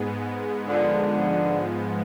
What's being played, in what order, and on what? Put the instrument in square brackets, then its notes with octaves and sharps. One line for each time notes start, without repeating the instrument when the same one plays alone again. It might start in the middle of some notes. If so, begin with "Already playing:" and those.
Already playing: [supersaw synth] G#2 G#3 B3
[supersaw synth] G#2 F3 G#3 B3 [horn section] D3